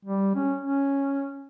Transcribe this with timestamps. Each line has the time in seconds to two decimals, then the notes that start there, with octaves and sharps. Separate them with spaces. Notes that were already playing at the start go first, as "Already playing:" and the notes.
0.05 G3
0.35 C#4
0.61 C#4